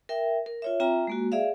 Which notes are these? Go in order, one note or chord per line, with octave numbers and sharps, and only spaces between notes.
A#4 E5 G5
A#4
F4 C#5 E5
C4 F4 E5 G5 A#5
G#3 A#3 F#4
G#4 D5 E5 F5